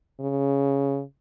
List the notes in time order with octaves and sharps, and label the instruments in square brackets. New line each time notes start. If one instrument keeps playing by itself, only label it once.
[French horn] C#3